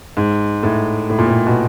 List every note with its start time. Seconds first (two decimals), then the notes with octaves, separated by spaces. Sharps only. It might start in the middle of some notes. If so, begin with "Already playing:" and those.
0.17 G#2
0.63 A2
1.10 A2
1.19 A#2
1.28 A2
1.47 B2